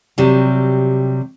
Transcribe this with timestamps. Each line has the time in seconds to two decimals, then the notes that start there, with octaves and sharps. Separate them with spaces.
0.18 C3 F#3 G3